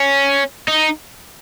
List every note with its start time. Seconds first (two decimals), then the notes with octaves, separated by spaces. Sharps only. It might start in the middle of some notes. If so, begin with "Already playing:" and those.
Already playing: C#4
0.68 D#4